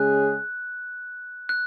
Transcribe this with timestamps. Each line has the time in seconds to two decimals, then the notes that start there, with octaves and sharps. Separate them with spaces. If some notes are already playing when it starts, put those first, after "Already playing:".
Already playing: C#3 G#3 C#4 G#4 F#6
1.49 F#6